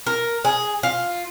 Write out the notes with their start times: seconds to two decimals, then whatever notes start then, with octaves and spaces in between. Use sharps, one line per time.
0.06 A#4
0.45 G#4
0.83 F4